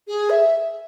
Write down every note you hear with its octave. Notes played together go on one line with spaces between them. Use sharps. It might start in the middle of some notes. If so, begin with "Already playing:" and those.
G#4
E5